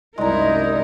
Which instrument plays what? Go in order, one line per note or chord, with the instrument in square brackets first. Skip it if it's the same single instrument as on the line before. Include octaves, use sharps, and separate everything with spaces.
[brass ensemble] C2 D#4 [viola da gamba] F#2 E4 A#4 [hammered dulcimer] G#3 A#5 [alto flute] D5